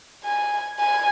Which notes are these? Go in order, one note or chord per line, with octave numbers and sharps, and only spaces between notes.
G#5
G#5